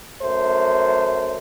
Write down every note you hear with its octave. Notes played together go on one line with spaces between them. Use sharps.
F#2 A3 C5